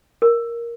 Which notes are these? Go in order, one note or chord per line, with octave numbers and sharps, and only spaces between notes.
A#4